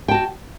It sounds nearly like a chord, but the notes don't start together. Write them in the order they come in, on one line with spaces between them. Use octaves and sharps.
G5 A5 F#4